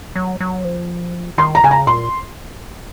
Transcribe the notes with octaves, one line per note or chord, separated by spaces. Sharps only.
F#3
F#3
F3
D#3 C6
A#5
C#3 G#5
A#5
A#2 C6